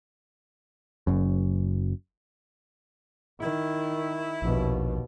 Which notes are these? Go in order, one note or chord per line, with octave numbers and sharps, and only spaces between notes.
F#1 F#2
D#3 E4
A#1 D#2 B2